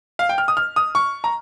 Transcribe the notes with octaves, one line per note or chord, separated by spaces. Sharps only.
F5
G5
F6
D#6
F6
D#6
C#6
A#5